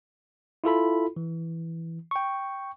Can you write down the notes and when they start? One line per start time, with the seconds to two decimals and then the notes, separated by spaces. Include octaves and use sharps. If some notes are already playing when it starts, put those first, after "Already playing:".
0.64 E4 F4 A4 B5
1.16 E3
2.11 G5 C#6